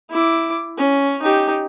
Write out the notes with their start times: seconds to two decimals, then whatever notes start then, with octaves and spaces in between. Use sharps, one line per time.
0.11 E4 D6
0.78 C#4
1.22 D#4 G4